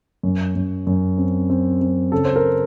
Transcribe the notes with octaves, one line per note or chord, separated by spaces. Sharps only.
F#2
F#2
F#2
C4
C4
C4
C#3 A4
C5
A#4